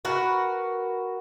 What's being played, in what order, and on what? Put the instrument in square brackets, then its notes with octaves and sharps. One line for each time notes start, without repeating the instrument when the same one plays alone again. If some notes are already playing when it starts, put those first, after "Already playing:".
[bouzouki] F#4 A#4 B4